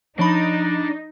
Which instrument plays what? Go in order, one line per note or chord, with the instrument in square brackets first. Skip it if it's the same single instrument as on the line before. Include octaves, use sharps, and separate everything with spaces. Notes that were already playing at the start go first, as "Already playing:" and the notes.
[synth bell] F3 B5 [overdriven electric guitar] D4 [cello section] D#4